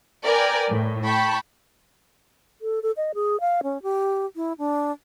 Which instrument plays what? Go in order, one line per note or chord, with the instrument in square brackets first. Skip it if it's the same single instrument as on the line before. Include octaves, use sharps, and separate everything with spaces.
[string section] A#4 B4 D5 G5 G#5
A2
G5 A5 B5 C#6
[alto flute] A4
A4
D#5
G#4
F5
C#4
G4
E4
D4